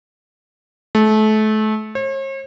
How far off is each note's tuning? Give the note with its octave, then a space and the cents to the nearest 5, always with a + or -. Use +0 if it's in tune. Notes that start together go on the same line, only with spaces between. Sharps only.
A3 -30
C#5 -45